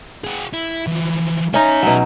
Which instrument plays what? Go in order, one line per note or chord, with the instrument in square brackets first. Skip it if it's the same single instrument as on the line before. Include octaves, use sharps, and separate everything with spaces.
[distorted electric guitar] F#4 G#4
E4
E3 F3
[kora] C#4 D#4 [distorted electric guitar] G#4 E5
[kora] B2 F#3